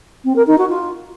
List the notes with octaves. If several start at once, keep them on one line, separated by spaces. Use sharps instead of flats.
C4
A#4
D#4
F#4
F4